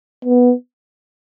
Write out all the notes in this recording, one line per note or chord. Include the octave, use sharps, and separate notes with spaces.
B3